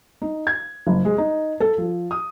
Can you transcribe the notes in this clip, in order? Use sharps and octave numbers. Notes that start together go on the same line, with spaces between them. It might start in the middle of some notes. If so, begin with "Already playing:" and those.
D#4
G#6
F#1
G#3
D#4
A4
F3
D#6